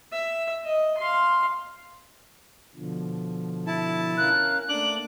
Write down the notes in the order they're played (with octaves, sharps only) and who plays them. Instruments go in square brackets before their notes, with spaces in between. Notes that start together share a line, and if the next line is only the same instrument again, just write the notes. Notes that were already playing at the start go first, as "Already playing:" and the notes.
[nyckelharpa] E5
D#5
F5 C6
[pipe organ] B2 D3 F3
[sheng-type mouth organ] E4 A5
[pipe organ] C#4 A#4 F5 [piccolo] F#6
[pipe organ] A3 A#3 [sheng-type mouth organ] D4 D6 [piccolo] F#7